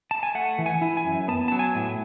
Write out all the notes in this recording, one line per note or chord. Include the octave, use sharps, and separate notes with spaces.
A5
G#5
A3 F#5
E3
G#5
E4
G#5
F#2
B3 A5
F#3 A5
G#5
A2